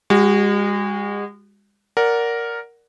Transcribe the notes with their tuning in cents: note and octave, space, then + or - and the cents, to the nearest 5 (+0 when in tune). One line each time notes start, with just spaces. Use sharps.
G#3 -40 F#4 +10
A#4 +0 D5 -20 F#5 +0